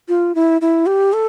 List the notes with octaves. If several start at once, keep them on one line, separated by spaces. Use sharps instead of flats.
F4
E4
E4
G4
A4